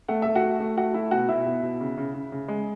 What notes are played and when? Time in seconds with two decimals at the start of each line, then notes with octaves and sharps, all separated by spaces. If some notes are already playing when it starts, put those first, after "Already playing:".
0.08 A3 F#5
0.22 A3 E5
0.35 F#4 F#5
0.43 A3
0.60 A3
0.77 A3 F#4 F#5
0.94 A3 E4 E5
1.11 B2 F#4 F#5
1.29 B2 E4 E5
1.46 B2
1.63 B2
1.80 C#3
1.98 C#3
2.14 C#3
2.32 C#3
2.48 G#3